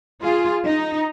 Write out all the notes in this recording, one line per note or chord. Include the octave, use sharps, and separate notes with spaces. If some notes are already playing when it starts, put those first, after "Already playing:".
F4 G#4
D#4